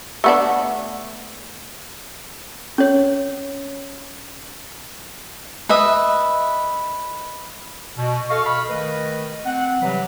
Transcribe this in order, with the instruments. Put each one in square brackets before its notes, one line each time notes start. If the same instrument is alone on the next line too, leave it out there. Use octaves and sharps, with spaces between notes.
[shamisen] A3 B3 D4
[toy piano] C#4 C#5
[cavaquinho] B4 D#5 E5 D#6
[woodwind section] B2
A4 D#5 F5 C#6
D#5 F5 B5 C#6 F6
D#3 A3 B4 D#5
C4 F#5
C3 E3 F#3 G3 B4